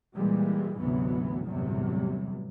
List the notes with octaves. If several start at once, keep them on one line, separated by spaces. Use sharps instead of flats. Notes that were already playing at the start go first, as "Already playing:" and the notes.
A#2 E3 G3 G#3
D2 G#2 C3 E3 F#3 B3
G1 E2 A2 C3 F#3 G3